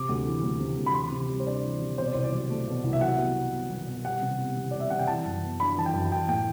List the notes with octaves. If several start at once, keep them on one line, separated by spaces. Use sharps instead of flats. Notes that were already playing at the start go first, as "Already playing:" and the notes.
Already playing: C3 D6
D2
E3
D2
C3
D2
B5
E3 C6
C3
G3
C5
D4 D5
E3
C3
B2 C5
D5
C2 C5
D5
F#3
A3
B2
C2
E5
F#3 F#5
B2
B3
B2
F#3
B2
G3 F#5
C3
B3
C3
G3 D5
E5
C3 F#5
G5
E3 A5
F#2
B3
D4 B5
E3 A5
G5
F#2
E3 G5
A2 G5